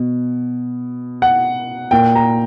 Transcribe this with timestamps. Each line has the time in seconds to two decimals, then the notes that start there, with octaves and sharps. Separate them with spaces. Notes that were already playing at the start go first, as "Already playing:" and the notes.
Already playing: B2
1.22 F#5
1.91 A#2 G5
2.16 A#5